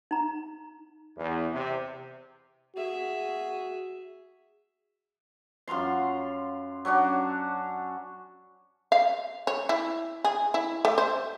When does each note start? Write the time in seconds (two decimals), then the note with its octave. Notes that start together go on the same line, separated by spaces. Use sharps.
0.11 D#4 A#5
1.17 E2
1.52 C3
2.77 F#4 G#4 E5
5.68 F#2 F4 A#5 C6
6.85 F#3 C#4 D4 F#4
8.92 F5
9.47 C#5
9.69 E4
10.24 G#4
10.54 E4
10.85 A3
10.98 C5